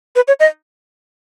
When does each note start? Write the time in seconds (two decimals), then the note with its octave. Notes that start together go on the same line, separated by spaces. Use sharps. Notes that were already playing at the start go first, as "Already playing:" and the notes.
0.16 B4
0.28 C#5
0.40 D#5